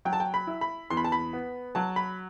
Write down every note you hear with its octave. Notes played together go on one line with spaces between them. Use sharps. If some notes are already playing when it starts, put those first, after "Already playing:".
F#3 G5
A5
G5
B5
E4
B5
E2 C6
B5
A5
B5
B3
F#3 A5
B5